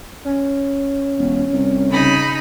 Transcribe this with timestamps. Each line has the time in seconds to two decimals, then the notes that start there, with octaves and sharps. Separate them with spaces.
0.25 C#4
1.18 E1
1.53 C2
1.91 C#3 D#4 B5